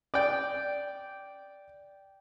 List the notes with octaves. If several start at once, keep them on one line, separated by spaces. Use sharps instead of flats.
D5 G5